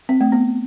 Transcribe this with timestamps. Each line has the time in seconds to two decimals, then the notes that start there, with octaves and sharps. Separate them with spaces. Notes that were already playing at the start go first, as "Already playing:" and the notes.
0.09 C4
0.21 A3
0.32 B3